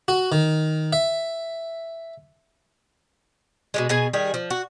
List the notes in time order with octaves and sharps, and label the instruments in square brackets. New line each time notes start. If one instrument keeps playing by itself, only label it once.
[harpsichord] F#4
D#3
E5
[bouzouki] B2 D3 G#3
B2 G#4 G#5
D#3 G3 G#4
F3
F#4